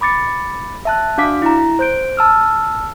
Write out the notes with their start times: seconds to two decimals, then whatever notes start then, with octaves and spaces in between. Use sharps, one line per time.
0.01 B5 D6 A6 C#7
0.85 E5 A5 F#6
1.18 D4 F#4 F5 D6 B6
1.42 E4 A#5
1.79 C5 G6 D7
2.17 A5 E6 F6